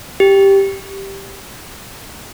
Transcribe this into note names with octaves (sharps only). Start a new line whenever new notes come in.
G4